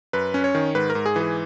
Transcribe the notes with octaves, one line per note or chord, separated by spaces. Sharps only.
F#2 B4
C#4
C#5
D#3
G#2 B4
A#4
G#2
G#4
E3 G#4